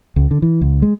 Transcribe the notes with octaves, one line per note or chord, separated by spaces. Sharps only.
C#2
D3
E3
C#2
G#3